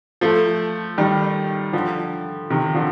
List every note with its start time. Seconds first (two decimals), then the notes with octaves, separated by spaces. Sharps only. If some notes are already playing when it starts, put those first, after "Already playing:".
0.21 F3 A3
0.98 D#3 G3
1.73 D3 F3
2.50 C3 D#3
2.75 D3 F3